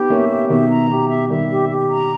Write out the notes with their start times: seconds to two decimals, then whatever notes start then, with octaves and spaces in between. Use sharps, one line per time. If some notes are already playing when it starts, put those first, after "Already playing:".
Already playing: B3 D#4 G4
0.10 A#3 C#4 E5
0.30 G4
0.49 B2 D#3 E5
0.70 A#5
0.90 B2 G4
1.10 E5
1.29 D#3 G3 E5
1.50 G4
1.70 G4
1.89 A#5